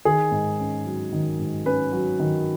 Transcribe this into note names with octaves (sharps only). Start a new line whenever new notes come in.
D#3 G#4
G#2
C#4
F#3
D#3
G#2
C#4 B4
F#3
D#3